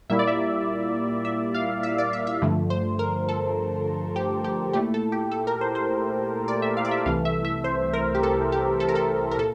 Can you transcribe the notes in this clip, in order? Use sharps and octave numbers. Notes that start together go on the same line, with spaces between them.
A#2 G3 A#3 E4 E5
D5
E5
E5
F5
E5
D5
E5
E5
G2 D3 F3 A3
C5
A#4
A4
G4
G4
A#2 A3 E4 G4
A4
G4
A4
A#4
C5
C5
D5
E5
F5
D5
E5
C2 C3 E3 A3 F5
E5
E5
C5
A#4
G4
A4
G4
A4
A#4
A4
A#4
A#2 A4